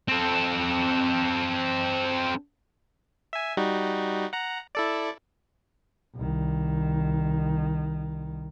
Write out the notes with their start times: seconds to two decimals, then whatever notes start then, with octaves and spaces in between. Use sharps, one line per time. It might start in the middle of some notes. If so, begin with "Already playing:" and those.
0.08 C4 A4
3.33 E5 G#5
3.57 G3 D#4 F#4
4.33 F#5 A#5
4.75 E4 A4 D5
6.16 C2 D#3